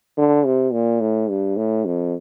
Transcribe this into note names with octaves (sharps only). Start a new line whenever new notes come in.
D3
C3
A#2
A2
G2
A2
F2